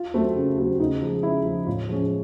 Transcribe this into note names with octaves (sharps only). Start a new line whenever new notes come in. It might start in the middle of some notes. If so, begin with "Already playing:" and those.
Already playing: F4
F#3 A3 C4
C#3
F#3 A3 C4
C#3 D#4
F3 G#3
C#3 E4
F3 G#3
A2 F4
F3 G#3 C#4